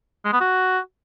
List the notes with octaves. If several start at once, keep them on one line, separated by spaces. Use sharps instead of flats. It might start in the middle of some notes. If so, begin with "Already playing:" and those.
G#3
B3
F#4